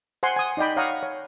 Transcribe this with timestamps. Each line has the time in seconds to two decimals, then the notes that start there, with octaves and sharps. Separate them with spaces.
0.23 C5 F#5 G#5 C6
0.36 G#5 D#6
0.57 D#4 D5 D#5 G5 B5
0.76 C#5 F5 F#5 A#5 C#6 D#6
1.03 C#5